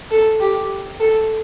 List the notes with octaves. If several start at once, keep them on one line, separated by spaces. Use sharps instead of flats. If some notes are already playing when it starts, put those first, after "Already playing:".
A4
G4
A4